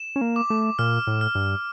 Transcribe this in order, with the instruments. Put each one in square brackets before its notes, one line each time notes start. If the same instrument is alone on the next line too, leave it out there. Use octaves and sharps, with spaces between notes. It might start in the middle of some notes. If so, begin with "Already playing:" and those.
Already playing: [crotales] E7
[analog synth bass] C#4
A#3
[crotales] D6
[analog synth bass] A3
[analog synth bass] A#2 [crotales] F6
[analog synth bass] A2
[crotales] F6
[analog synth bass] G2